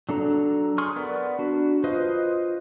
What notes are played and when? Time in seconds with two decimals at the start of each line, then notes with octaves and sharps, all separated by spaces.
0.09 F#3 D4 A4 A#5
0.78 G#4 C6 C#6 F6
0.96 B3 A#4 D5
1.39 D4 F#4
1.84 F4 B4 C5 D#5